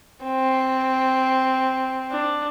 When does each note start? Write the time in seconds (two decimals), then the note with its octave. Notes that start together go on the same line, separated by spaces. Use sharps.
0.24 C4
2.11 D4